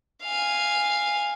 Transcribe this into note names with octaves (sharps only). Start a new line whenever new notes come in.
F5 G#5